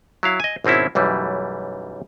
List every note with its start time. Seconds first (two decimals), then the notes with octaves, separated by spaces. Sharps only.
0.23 F#3 E4 F5
0.40 D#5 G#5
0.64 G#1 B2 C4 C#4 E4
0.95 B1 F#2 E3 G3 A3